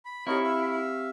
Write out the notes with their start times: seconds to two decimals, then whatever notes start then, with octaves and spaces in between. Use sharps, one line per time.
0.05 B5
0.27 C4 D#4 E4 G4 A#4 C#5
0.44 E5 F5